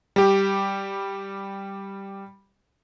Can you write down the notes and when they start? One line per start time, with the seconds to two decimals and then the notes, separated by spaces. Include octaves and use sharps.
0.16 G3 G4